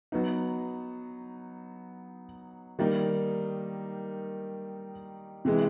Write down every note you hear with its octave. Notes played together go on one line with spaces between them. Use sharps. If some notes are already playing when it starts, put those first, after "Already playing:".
F#3 B3 D#4
D#3 G3 A#3 D#4
C3 E3 G#3